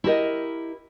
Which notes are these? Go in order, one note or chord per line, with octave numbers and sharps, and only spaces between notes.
E4 G4 A#4 D#5